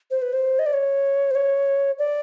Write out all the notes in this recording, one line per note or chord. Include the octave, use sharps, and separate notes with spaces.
C5
B4
C5
D#5
D5
C#5
C5
C#5
D5